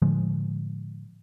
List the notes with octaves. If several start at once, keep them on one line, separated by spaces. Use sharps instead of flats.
A2 D3 F3 G#3